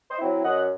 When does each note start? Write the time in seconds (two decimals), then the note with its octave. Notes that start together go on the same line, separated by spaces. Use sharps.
0.10 C5 D#5
0.19 F#3 C4 E4
0.44 F#2 D#5 F#5